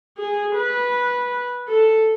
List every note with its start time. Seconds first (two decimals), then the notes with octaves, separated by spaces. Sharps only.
0.18 G#4
0.56 B4
1.68 A4